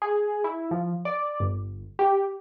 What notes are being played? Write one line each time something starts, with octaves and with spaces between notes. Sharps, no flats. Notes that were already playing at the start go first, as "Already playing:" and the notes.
G#4
E4
F3
D5
G1
G4